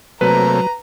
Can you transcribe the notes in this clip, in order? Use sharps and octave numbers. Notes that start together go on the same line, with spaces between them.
C3 F#3 A3 A#3 B4 A#5